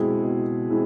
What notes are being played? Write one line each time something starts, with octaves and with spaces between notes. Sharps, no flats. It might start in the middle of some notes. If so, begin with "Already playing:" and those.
Already playing: B2 G#3 C4 E4 G#4
B2
G#3 C4 E4